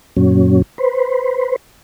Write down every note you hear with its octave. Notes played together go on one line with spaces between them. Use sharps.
F#2 A#2 F#3 C#4
B4 C5